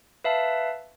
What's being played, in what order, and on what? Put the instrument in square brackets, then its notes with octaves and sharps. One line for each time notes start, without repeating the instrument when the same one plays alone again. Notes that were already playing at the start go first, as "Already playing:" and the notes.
[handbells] B4 E5 F5 A5